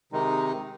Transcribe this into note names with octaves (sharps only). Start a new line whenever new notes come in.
C3 D#3 G#3 D#4